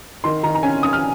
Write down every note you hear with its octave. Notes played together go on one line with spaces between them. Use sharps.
D#3 C6
D#3 A#5
A#5
C#4 G#5
C#4 D#6
F6